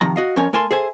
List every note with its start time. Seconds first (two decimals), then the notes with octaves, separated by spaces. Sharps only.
0.01 C3 D#3 F3 A#5
0.16 F#4 D#5 F5
0.36 F2 F3 C#4 A#4 C#5 G#5
0.53 A3 A#4 G#5 A5 C6
0.71 G#4 A4 C5 E5 G#5